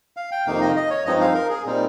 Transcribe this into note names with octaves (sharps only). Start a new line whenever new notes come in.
F5
G5
F2 C3 D#3 A#3 D#4 F5
D#5
D#5
C#5
G2 F3 G#3 C4 D#4 D#5
F5
A#4
G#4
A#2 G3 C4 D#4